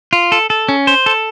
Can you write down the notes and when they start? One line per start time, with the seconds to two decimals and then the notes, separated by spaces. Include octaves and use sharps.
0.13 F4
0.32 A4
0.50 A4
0.69 C#4
0.87 C5
1.06 A4